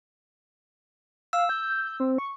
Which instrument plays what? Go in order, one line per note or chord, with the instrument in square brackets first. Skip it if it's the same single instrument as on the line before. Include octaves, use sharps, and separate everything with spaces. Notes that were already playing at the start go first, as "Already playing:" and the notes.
[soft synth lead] F5 [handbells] E6
[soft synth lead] G6
C4
C#6